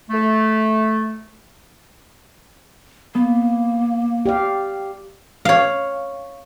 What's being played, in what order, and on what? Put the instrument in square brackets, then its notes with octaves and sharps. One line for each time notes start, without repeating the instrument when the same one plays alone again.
[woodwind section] A3
[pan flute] A#3 [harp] B3
[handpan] G4 D5 F5
[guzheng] C#5 F5